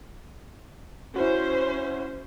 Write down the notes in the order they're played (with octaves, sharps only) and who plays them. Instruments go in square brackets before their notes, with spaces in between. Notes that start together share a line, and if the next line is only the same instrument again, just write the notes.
[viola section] C#4 C5 [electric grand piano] E4 F#4